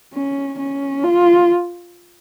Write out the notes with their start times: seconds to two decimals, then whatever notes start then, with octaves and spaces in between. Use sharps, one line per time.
0.14 C#4
0.59 C#4
1.03 F4